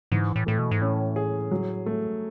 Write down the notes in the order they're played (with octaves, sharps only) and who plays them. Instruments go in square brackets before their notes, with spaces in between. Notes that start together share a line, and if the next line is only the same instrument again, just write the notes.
[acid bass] G#2 [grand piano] E3
[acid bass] A2
[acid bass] A2 [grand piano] A3
[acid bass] B2
G#2
[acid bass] A2 [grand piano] C#4
[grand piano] G#4
F#3
A3